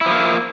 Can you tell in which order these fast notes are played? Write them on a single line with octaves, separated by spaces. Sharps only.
E4 F3 A#3